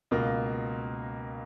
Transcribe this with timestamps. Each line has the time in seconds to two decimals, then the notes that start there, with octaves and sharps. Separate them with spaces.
0.11 C#2 B2 A#3